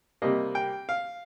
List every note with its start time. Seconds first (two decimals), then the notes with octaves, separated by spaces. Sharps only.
0.22 C3 G3 A#3 D#5
0.55 G5
0.89 F5